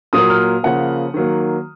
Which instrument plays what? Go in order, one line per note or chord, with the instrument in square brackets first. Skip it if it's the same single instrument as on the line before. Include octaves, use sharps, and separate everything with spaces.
[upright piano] A#2 F#3 A#3 D#6
F6
C#3 F3 A#3 F#5
D#3 F#3 A#3